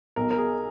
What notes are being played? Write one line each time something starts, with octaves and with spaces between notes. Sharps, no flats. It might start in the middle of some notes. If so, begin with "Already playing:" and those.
B1 B2 A#4
A#4
G#4